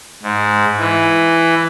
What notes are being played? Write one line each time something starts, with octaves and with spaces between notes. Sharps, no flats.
G#2
E3